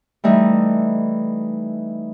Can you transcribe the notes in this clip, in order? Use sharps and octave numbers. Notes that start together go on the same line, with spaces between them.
E3 G3 A3 D#4